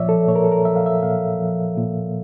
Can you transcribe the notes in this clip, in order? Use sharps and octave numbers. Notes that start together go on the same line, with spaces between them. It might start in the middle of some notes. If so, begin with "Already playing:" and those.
Already playing: A#2 F3 C#5 D5 E5
A4
A#2 C#5
A#4
A4
A#4
F3 E5
F5
E5
A#2 F5
F3
A#2